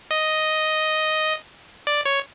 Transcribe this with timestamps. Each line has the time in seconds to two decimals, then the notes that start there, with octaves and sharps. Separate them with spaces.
0.11 D#5
1.87 D5
2.06 C#5